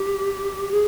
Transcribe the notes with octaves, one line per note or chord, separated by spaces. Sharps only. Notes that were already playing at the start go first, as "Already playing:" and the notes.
Already playing: G4
G#4